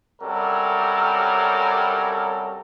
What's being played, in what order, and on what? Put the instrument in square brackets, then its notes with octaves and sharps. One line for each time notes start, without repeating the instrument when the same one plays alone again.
[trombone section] C3 F#3 G3 C#4 A4 A#4